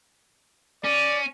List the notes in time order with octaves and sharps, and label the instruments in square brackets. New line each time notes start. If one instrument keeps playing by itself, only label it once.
[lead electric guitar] C#4 [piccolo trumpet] D5